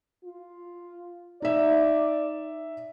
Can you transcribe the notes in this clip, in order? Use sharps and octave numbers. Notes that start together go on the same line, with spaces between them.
F4
D#4 D5 E5